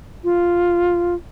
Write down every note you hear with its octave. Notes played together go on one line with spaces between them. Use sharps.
F4